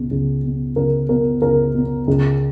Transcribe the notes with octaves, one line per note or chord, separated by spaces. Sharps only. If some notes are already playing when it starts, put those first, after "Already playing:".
Already playing: C#2 B2
C#2
B2
C#2 A#4
B2 A#4
C#2 A#4
B2
C#2